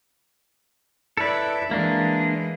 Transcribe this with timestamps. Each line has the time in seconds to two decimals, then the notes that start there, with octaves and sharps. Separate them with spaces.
1.17 E4 A4 B4 D5
1.71 E3 G#3 A#3 D4